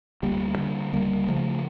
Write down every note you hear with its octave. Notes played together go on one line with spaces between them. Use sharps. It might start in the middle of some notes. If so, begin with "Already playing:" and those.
D2 G3 A#3
D3
C#2 G3 A#3
C#3 F3 A3